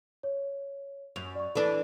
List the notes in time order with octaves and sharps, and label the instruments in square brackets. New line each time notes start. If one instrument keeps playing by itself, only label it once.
[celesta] C#5
[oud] F#2 [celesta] F7
[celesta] D5 C#6
[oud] E3 D4 [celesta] A4